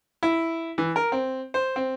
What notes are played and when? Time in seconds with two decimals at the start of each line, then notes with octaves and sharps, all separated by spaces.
0.23 E4
0.78 E3
0.96 A#4
1.12 C4
1.54 C5
1.76 C4